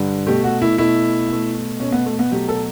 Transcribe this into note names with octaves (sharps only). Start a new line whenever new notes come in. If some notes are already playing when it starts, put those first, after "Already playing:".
Already playing: G2 D3 G3
B2 A3 G4
F#4
E4
B2 A3 E4
B2 A3
B2 A3 C#4
B3
A3
B3
B2 F#3 A3 G4
A4